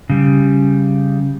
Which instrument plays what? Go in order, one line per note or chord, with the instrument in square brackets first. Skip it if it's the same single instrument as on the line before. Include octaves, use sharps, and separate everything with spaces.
[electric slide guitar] C#3 G3